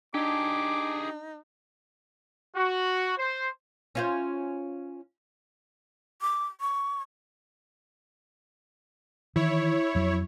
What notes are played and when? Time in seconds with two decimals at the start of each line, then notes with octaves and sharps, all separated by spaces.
0.14 D4 D#4 G4 G#4 D6
2.57 F#4
3.18 C5
3.95 C#4 F4 C5
6.22 D6
6.61 C#6
9.36 D#3 E3 E4 C#5
9.95 F2 F#3